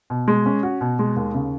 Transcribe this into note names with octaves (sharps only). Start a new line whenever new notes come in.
B2
G#3
C#4
F#4
B2
G#3
D#2
C#3